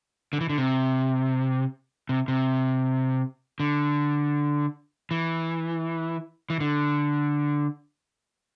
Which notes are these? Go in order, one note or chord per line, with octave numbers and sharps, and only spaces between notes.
D3
E3
D3
C3
C3
C3
D3
E3
E3
D3